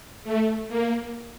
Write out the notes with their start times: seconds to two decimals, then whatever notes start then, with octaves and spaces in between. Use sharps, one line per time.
0.24 A3
0.69 A#3